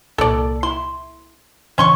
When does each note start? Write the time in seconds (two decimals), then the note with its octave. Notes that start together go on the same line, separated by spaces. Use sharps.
0.18 C2 A#2 A4 D5
0.63 E4 C6
1.78 C#2 A2 E3 C#4 C6 C#6